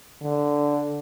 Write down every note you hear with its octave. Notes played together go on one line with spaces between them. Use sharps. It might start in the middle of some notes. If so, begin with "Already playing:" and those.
D3